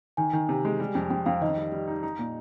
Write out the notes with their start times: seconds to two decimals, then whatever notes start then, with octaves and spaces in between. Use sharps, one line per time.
0.17 D#3 G#5
0.33 D#3
0.49 C3
0.65 G#3
0.80 G3
0.95 F2
1.10 F2 G5
1.26 F2 F5
1.41 D#3 D#5
1.57 G3
1.72 G3
1.88 D#4
2.03 D#4
2.19 A#2